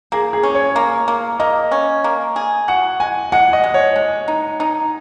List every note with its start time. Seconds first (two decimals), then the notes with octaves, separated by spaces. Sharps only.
0.12 A#3 G#4
0.33 G#4
0.43 C#4
0.55 C#5
0.76 A#3
1.08 A#3
1.40 A#3 D#5
1.71 C#4
2.04 A#3
2.36 G#4
2.68 F#4 F#5
3.00 G#3 G#5
3.32 G#3 F#5
3.53 D#5
3.64 G#3
3.74 C#5
3.96 G#3
4.28 D#4
4.60 D#4